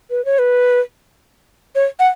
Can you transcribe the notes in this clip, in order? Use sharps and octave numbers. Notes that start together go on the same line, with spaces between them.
B4
C#5
B4
C#5
F#5